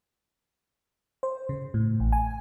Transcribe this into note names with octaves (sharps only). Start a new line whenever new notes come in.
C5
C#3
A2
A1
G#5